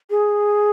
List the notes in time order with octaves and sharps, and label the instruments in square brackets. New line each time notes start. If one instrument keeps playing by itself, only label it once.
[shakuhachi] G#4